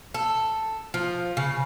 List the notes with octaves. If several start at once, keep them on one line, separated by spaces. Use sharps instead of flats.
A4
F3
C#3